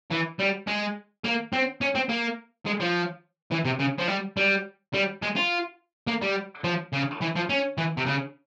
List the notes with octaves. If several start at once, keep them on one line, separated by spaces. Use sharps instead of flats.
E3
G3
G#3
A#3
C4
C#4
C4
A#3
G#3
F3
E3
C3
C#3
F3
G3
G3
G3
G#3
F4
A#3
G3
F3
C#3
E3
F3
C#4
E3
C3
C#3